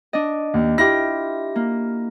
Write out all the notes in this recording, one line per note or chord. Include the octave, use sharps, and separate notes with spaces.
D4 D#5
D#2
E4 F4 G4 A#6
A#3